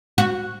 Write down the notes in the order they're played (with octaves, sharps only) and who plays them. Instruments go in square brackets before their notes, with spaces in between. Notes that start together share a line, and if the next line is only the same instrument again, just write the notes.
[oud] F#4